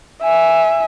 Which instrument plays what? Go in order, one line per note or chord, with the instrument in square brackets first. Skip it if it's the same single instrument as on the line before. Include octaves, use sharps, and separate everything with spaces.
[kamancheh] E5 G#5